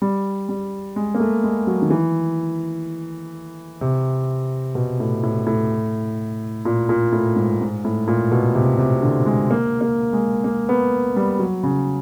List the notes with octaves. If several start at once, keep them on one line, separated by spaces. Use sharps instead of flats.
G3
G3
G#3
A#3
A3
G#3
F#3
D#3
E3
C3
B2
A2
A2
A2
A#2
A#2
A2
G#2
G#2
A2
A#2
B2
C3
C3
D3
G#3
A#3
A#3
G#3
A#3
B3
G3
F#3
C#3